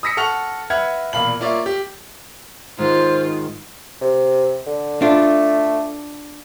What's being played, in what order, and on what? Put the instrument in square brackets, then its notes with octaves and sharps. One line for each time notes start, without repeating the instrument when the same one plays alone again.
[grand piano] D#6 E6 A#6 B6 C#7
A4 F#5 C#6 F6 F7
B4 E5 F#5 F6 G#6
E1 A#2 F5 B5 F#7
A#3 F4 C#5 D5 E5
G4
[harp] G#2 [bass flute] D#3 [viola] F4 [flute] C5
[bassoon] C3
D3
[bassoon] A3 [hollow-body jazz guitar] D4 F4